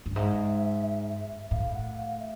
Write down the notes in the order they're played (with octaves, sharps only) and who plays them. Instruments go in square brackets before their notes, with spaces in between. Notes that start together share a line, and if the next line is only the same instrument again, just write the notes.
[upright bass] G2
[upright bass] G#2 [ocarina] E5
[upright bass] A2 [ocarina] F5
[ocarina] F#5
F5
E5